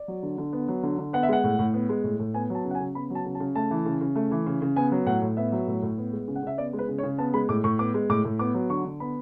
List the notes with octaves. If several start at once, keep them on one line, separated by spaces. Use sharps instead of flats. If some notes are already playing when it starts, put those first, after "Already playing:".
Already playing: D5
F#3
D3
D3
B3
F#3
D3
D3
B3 F#5
E5
G#3 F#5
A2
A2
B3
G#3
A2
A2
B3 G#5
F#3 A5
C#3
F#5
G#5
C#3
B3 B5
F#3
A5
C#3
A5
C#3
A3 A5
E3
C#3
C#3
A3
E3
C#3
C#3
B3 G#5
F#3
A2 F#5
A2
B3 E5
F#3
A2
A2
B3
G#3
C#3
F#5
C#3 E5
B3 D5
G#3
B4
C#3
C#5
C#3
B3 A5
G#3 B5
A2 D6
A2 C#6
B3 D6
G#3
A2 D6
A2
B3 D6
F#3
D3 C#6
D3
B3 B5